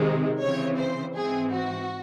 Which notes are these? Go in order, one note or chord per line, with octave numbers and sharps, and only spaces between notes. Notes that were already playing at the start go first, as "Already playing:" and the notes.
Already playing: C3 D#3 G#3 C4
C#3 E3 C4 C#5
C5
G#2 E3 C4 G#4
F#4